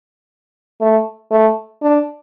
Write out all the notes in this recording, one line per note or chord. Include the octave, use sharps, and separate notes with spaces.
A3
A3
D4